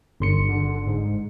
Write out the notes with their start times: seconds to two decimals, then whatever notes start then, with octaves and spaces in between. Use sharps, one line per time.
0.20 G1 C6 C#7
0.49 D3
0.87 G#2